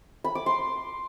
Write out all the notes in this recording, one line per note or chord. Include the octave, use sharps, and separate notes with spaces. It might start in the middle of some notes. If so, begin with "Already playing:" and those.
B5
D6
C6